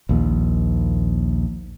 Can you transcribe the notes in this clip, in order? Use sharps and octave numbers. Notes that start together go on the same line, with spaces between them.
A#1 D#2